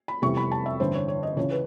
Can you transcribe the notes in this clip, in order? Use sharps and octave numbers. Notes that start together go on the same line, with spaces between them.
B5
F1 E2 C3 E3 G3 C#6
B5
A5
E5
A1 G2 D3 C5
C#5
C#5
D#5
C#2 C#3 E3 C#5
B4